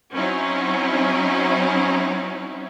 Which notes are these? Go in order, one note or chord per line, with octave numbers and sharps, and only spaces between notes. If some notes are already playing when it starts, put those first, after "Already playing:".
F#3 C4 C#4 D#4 E4